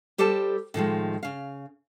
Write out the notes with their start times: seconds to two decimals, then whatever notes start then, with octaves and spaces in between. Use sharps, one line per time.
0.18 G3 G4 A4 C5 A5
0.74 A2 D#3 F3 G#3
1.23 C#3 F5